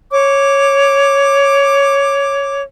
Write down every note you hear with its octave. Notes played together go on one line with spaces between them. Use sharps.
C#5 D6